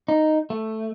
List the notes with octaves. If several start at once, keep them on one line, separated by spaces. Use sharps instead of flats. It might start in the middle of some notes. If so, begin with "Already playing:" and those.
D#4
A3